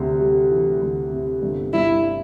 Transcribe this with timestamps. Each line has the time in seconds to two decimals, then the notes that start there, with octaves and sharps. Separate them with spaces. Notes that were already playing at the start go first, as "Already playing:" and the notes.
Already playing: D2 C3
0.20 G3
0.51 E3
0.82 D2
1.12 C3
1.42 G1
1.73 G2 E4